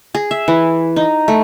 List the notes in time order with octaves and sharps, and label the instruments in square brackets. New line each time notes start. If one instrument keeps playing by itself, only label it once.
[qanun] G#4
E5
E3
D#4
A3